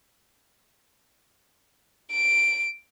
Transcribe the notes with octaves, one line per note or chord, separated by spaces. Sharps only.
D7